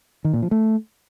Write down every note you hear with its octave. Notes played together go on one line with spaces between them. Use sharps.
D#3
A#2
F3
A3